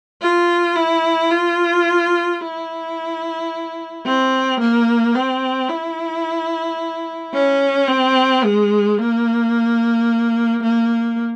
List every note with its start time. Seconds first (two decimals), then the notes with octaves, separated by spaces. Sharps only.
0.22 F4
0.76 E4
1.31 F4
2.41 E4
4.06 C4
4.60 A#3
5.15 C4
5.69 E4
7.34 C#4
7.89 C4
8.44 G#3
8.98 A#3
10.63 A#3